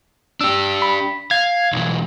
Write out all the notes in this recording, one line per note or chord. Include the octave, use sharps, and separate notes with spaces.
D4 G4 E6
B5
F5 G#6
B1 E3